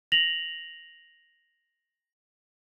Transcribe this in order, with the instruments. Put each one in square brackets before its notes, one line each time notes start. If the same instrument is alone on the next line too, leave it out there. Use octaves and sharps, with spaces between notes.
[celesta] A#6 F7 F#7